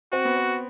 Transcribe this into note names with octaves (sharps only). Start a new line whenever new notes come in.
C4 F#4
B3
C4